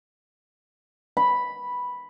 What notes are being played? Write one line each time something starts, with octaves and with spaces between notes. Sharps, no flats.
B5